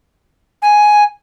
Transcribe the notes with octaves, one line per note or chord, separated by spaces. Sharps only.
G#5